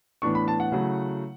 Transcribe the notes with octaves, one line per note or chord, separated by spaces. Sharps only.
A2 E3 B3 D4 C#6
B5
A5
F#5
C#3 F#3 A3 E4